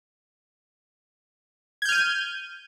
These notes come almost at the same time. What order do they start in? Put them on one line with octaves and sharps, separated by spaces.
G#6 G6 F6 D#7